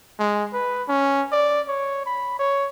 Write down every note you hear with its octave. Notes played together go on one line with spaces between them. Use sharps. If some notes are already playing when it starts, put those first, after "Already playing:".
G#3
B4
C#4
D5
C#5
B5
C#5